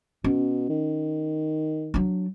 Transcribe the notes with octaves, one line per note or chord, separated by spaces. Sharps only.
B2 C#4
D#3
F#3 D4